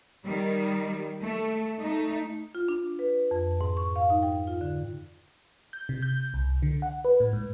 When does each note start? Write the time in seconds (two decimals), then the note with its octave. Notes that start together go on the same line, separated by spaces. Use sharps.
0.25 D#3 G3
1.23 A3
1.79 A3 D#4
2.55 F4
2.68 D4
2.99 B4
3.31 F2
3.61 G#2
3.77 C#6
3.96 F5
4.10 D#4
4.23 G5
4.47 F4
4.61 D3
5.73 G6
5.89 C3
6.02 G6
6.34 C2
6.62 D3
6.82 F#5
7.05 B4
7.20 A2
7.33 G#2